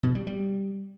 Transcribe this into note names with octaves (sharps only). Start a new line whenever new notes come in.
B2
G3
G3